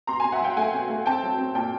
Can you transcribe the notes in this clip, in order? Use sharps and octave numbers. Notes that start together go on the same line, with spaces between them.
B2 A#5 C6
B2 G#5 A#5
E5 F#5
F#3 F5 G5
A3 F#5 G#5
B2
A3
C4 G5 A5
F#3
C4
A#2 G5 A5